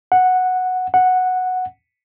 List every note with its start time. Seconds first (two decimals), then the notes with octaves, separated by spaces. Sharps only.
0.12 F#5
0.94 F#5